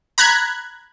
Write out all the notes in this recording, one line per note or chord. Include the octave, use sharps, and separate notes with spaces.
A#5 B5 F#6 G#6